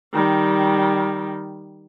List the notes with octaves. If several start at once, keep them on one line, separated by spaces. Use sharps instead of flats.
D#3 G3